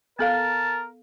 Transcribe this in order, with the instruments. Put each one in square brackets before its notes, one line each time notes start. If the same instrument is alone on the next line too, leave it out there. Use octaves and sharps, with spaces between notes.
[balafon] B3 A4 F5 [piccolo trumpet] A#4 [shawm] A5